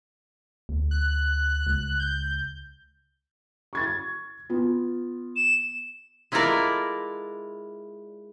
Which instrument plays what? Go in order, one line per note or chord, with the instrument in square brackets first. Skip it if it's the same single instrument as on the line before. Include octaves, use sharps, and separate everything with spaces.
[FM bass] D2
[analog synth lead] F#6
[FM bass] C#2
[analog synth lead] G6
[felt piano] C#6 G#6 A6
B3 F4
[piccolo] E7
[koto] G#3 E4 F4 A4 A#4 D5